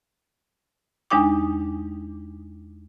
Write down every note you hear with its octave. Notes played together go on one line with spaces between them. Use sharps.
E2 G#3 D4 D#4 G5 D6